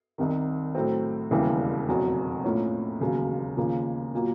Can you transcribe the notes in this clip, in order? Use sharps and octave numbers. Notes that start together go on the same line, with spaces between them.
C2 C3 D#3
A2 F#3 A3 C4
E1 D#2 C#3 E3 G3
F1 E2 B2 F#3
A2 F3 A#3 C#4
E1 D#2 C#3 F#3
D#2 C#3 F3 A#3
A#2 F#3 A#3